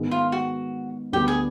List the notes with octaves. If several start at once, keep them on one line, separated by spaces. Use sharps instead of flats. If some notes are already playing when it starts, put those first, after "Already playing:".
Already playing: G#2 D#3 G#3 B3
F4
F#4
D2 D3 G3 B3 G4
G#4